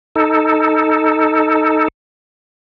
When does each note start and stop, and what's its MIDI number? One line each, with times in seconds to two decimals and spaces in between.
0.16 1.88 63
0.16 1.88 69